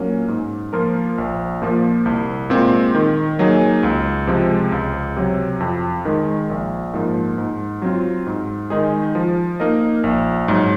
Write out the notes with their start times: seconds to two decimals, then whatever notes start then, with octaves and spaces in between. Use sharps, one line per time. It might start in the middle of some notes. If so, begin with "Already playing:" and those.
Already playing: A#2 F#3 A#3 C#4
0.28 G#2
0.73 F3 A#3 F4 A#4
1.18 A#1
1.62 A#2 F3 A#3
2.06 C2
2.50 A#2 G#3 C4
2.95 D#3
3.39 F#3 A#3 D#4 G#4
3.83 C#2
4.27 C3 F3 G#3
4.72 C#2
5.17 C3 F#3
5.60 F2
6.05 D#3 G#3
6.50 A#1
6.94 G#2 F3 A#3
7.38 G#2
7.82 F#3 C4 F4
8.26 G#2
8.70 D#3 G#3 D#4 G#4
9.15 F3
9.60 A#3 D#4 A#4 D#5
10.04 A#1
10.48 G#2 F#3